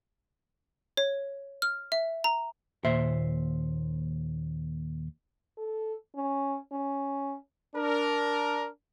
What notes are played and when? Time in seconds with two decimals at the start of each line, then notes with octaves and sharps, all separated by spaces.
0.97 C#5
1.62 F6
1.92 E5
2.24 A#5
2.84 D#2 A#2 C5 E5
5.57 A4
6.15 C#4
6.72 C#4
7.76 D4 A#4